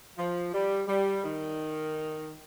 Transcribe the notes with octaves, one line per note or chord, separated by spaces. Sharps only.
F3
G3
G3
D#3